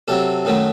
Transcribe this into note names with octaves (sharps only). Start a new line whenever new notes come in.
C3 F#3 C4 A4
F#2 D#3 F#3 A3